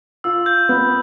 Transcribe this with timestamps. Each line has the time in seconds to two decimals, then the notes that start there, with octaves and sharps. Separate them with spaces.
0.24 F4 E6
0.46 G6
0.69 B3